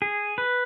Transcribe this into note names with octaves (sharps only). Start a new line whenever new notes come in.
G#4
B4